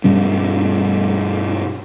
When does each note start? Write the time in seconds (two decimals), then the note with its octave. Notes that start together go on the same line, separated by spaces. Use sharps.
0.04 G2 B2 G3 C#4